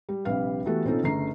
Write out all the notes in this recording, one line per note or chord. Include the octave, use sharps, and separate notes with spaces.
G3
A#1 C3 G3 G4 B4 F5
E3 A3 B3 F#4 G4 A4
B2 C4 C#4 D#4 F4 A4
G1 C#3 A3 A#5 C7